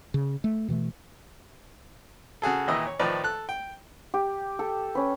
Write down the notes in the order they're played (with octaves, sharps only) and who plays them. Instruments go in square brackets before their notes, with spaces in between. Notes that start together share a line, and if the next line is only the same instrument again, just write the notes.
[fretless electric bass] C#3
A3
B2 E3 F3 A3
[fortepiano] C#3 F#4 G#4 A4
A#2 D#3 E3 E4 D#5
C#5
A2 D#3 F3 B4 D5
A4 F#6
G5
[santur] G4
A4
C#4 B4